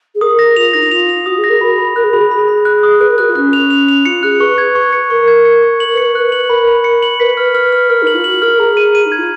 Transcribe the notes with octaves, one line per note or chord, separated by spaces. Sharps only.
G#4
A#4 D#6
A#6
F4 F7
D#4 A#6
D#4
F4 F7
F7
F#4 D#6
G#4
A#6
A#4
F#4 B5
B5
A#4 F#6
G#4
F#4 B5
G#4
B5
B5
F#6
D#6
B4 F#6
A#4
F#4 F#6
F4
C#4 F#6
F7
F7
F7
F4 C#7
G#4 F#6
B4 C#6
G#6
C#6
C#7
A#4 C#6
G#6
C#7
C#6
F#7
B4 C#7
A#4
B4 F#6
F#7
A#4 B5
B5
C#7
F#7
B4 B6
B4 F6
F6
F6
A#4 F6
D#4
F#7
F4
F#4 F#7
A#4 F6
G#4 A#5
D#7
D#7
D#4
G#6
F4